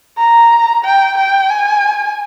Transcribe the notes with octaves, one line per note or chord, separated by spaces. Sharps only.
A#5
G5
G5
G#5